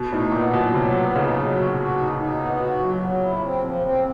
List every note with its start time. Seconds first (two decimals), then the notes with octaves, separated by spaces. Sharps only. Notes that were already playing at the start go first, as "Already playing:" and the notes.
Already playing: B2
0.12 A2 D#4
0.32 A#2 B3
0.53 B2 F#3
0.74 C3 F#3
0.94 B3
1.15 C#3 D#4
1.35 F#3
1.56 F#4
1.77 F#4
1.98 D#4
2.18 D#4
2.39 B3
2.59 F#4
2.80 F#3
3.01 F#3
3.22 E4
3.42 C4
3.62 F3
3.83 C4